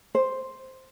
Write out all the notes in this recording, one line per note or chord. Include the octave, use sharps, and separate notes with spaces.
C5